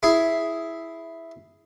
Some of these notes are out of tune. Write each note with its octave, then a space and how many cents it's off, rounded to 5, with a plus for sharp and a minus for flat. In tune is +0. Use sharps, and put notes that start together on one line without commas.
E4 +0 G#4 +5